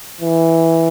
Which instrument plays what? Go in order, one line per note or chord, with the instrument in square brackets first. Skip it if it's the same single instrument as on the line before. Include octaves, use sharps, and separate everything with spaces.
[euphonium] E3